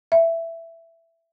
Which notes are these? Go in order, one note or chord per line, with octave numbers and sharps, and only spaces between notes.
E5